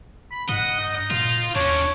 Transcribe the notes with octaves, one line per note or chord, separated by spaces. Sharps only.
B5
G2 D#5 F#5
D#4
A#2 F4
D#2 C#4 D4 C#5